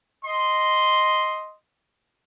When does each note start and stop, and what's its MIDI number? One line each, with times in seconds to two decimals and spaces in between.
0.24 1.53 75
0.24 1.53 84